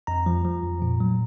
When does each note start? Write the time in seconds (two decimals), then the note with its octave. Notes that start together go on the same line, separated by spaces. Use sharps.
0.07 F2 A#5
0.26 F3
0.45 F3
0.63 F2
0.82 A#2
1.00 F#3